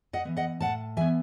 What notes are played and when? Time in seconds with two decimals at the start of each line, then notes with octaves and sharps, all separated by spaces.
0.13 D#5 F#5
0.25 E3 B3
0.37 D#5 F#5
0.61 A2 F#5 A5
0.97 E3 B3 E5 G#5